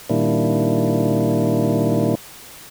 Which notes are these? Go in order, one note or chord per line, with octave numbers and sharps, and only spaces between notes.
A#2 D#3 G3 A#3 D4 E4